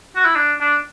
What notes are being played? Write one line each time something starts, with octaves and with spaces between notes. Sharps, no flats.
F#4
E4
D4
D4